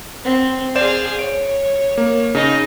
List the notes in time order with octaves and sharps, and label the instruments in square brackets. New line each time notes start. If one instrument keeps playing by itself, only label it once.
[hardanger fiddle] C4
[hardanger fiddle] G#4 F5 [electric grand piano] C5 D5 E7
[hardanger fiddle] C#5 [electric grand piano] D7
[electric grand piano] A#3
[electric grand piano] C#3 [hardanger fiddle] D#4 D#5